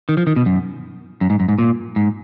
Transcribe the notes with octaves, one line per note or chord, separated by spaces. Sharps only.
D#3
F3
D#3
B2
F#2
F#2
G#2
F#2
G#2
A#2
G#2